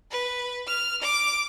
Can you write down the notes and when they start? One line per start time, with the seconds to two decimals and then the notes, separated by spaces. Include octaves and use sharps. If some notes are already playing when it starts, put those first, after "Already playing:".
0.11 B4
0.67 F6
1.02 D6